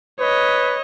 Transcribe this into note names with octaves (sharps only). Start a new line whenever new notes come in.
B4 C#5 D#5